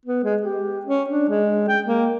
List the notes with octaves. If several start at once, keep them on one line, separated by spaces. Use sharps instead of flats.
B3
G#3
G4
C#4
D4
G#3
G5
A#3